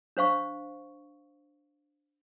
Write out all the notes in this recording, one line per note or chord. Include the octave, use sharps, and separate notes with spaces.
D4 C5 F5 C#6